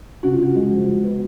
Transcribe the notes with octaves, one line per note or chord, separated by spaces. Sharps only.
C#3 F#4
F4
C#3 F#4
G#3
F3
G#3
B3